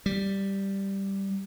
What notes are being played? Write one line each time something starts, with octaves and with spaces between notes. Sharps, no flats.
G3